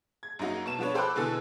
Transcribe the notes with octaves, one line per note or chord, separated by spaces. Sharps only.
G#6
F#2 A#3 D#4 F#4
B2 A5 E7
F3 B3 D4 B4 C#5
A4 C5 G5 B5 D6 F#6
B2 D3 E3 G#4 A4